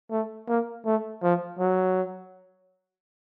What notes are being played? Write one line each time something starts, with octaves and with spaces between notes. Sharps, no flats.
A3
A#3
A3
F3
F#3